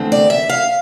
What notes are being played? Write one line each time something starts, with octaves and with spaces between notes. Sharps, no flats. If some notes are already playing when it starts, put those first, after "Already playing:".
Already playing: E2 D3 A3 C4
D5
E5
F5